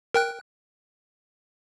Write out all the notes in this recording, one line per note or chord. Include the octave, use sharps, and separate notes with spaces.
A#4 G5 F#6